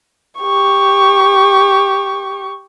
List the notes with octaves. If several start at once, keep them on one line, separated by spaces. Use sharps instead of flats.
G4 C#6